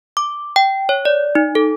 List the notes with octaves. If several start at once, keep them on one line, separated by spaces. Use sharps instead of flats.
D6
G5
C#5
D5
D#4
A4